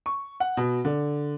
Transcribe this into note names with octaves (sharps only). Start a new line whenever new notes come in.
C#6
F#5
B2
D3